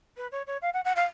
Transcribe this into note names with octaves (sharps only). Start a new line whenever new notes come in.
B4
C#5
C#5
F5
F#5
F#5
F5